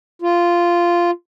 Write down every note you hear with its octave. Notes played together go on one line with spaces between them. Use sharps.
F4